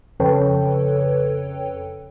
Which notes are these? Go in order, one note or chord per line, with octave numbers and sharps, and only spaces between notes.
F2 C#3 A4 B4 C#5 G5